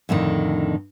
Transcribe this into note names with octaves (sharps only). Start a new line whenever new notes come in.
F2 A2 D3 D#3